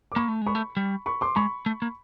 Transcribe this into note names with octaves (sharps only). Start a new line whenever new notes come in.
D6
A#3 B5 C#6
A3
G#3 B5 C#6
A3
G3
B5 C#6
C6 D6
G#3 B5 C#6
A3
A#3